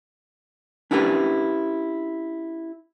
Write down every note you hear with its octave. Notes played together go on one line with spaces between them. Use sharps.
C#4 D4 E4 G4 A#4 B4